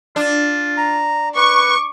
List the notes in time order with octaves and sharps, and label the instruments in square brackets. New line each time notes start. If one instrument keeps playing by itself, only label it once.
[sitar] D4 [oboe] F4
[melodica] A#5
[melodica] B4 [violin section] C#6 [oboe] D6